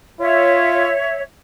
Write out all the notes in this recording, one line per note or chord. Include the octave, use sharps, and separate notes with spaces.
F4 C#5 E5